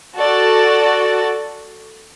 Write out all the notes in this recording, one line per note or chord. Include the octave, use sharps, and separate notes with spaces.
F#4 A4 D5